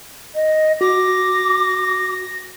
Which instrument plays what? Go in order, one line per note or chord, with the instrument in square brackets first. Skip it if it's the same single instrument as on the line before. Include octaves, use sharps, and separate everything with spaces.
[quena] D#5
[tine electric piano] F#4 [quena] D6 [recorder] A#6